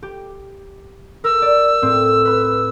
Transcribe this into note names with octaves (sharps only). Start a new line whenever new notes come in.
G4
A#4 E6
D5
A2 C4
B4 B5